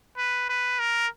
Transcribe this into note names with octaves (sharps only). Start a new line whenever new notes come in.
B4
B4
A#4